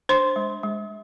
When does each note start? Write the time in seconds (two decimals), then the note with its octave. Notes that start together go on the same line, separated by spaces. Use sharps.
0.09 D4 C5 C6
0.36 G#3
0.63 G#3